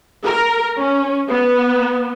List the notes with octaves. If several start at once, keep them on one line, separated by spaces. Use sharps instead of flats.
A#4
C#4
B3